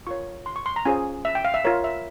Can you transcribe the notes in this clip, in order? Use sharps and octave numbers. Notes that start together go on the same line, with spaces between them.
F4 A#4 C#5 C#6
C6
C#6
C6
A#5
C#4 F4 G#4 C5 G#5
E5
G5
F5
E5
F4 A#4 C#5
E5